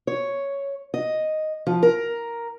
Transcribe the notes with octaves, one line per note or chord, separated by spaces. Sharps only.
C#5
D#5
F3
A#4